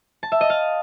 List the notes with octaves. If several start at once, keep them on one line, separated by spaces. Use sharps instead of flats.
A5
E5
D#5
F5